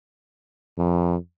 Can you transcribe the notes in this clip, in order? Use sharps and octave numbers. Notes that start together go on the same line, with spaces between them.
F2